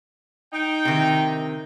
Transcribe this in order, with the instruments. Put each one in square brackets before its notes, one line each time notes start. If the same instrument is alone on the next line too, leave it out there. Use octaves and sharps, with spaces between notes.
[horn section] D#4 G5
[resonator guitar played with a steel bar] C3 D#3